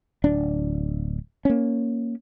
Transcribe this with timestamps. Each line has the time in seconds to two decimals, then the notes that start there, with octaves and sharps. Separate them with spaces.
0.24 D1 D4
1.45 A#3 C#4